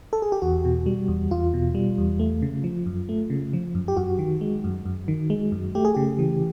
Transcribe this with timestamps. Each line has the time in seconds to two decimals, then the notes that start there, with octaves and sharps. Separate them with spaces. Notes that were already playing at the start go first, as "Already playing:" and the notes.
0.13 A4
0.22 G#4
0.32 G4
0.42 E2 F#4
0.65 B2
0.86 G3
1.08 E2
1.31 E2 F4
1.54 B2
1.75 G3
1.98 E2
2.19 A3
2.42 C#3
2.64 F3
2.86 F#2
3.09 A3
3.30 C#3
3.53 F3
3.75 F#2
3.88 G4
3.97 F#2 F#4
4.19 D#3
4.41 G#3
4.64 F#2
4.86 F#2
5.08 D#3
5.30 G#3
5.52 F#2
5.75 A3 G4
5.85 G#4
5.94 C#3 G4
6.19 E3